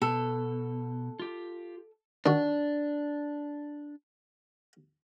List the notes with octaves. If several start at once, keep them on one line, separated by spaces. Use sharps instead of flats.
B2 A4
F4 G4
D#3 D4 F#4